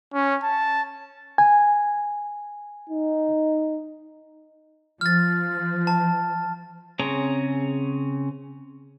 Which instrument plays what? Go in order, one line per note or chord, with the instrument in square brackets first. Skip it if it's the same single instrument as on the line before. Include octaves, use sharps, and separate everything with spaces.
[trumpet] C#4
A5
[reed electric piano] G#5
[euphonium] D#4
[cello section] F3 [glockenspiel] F6 A6
[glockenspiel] A5
[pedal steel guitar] C#3 C4 G#4 C#5 A#5